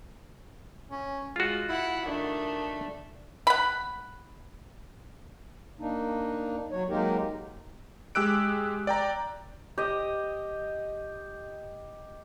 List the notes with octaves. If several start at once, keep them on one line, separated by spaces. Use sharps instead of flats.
C#4
G#3 F4 F#4
E4 F#5
D#3 A3 D4
F#5 B5
A#3 D4 D#4
F#3 C#5
F#3 G#3 A#3 D#4 G4 A#4
G#3 G4 E6 F#6 D7
D5 G5 A#5
G4 D#5